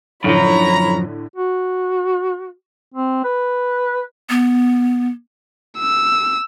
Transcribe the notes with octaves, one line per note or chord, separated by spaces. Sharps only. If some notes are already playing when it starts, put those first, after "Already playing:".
F#2 A2 D3 F3 C#5 A#5 B5
F#4
C4
B4
B3
E6